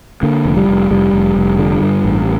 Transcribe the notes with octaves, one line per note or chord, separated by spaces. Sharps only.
D3 A#3
F1
G3
F1
F1 G3
F1
F1
D3
G2
A1